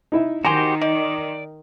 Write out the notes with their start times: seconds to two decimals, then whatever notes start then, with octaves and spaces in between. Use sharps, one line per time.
0.12 D#4 E4 E5
0.45 D#3 F#4 G4 C5 G#5 A#5 C6
0.81 D#4 D5